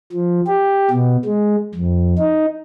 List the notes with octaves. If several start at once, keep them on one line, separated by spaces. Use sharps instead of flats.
F3
G4
B2
G#3
F2
D#4